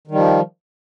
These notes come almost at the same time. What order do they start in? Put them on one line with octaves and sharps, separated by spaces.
D#3 G3 F3